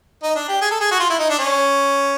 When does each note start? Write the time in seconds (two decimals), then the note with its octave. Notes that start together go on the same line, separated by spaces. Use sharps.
0.23 D#4
0.36 D4
0.48 G4
0.61 G#4
0.71 A4
0.80 G#4
0.91 F#4
1.00 F4
1.10 E4
1.19 D#4
1.30 D4
1.39 C#4